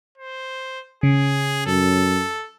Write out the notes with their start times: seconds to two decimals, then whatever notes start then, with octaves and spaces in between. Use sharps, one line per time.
0.18 C5
1.03 C#3 G#4
1.66 F#2 A4